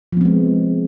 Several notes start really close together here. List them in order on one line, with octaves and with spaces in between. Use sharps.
F3 B3 C4 G#3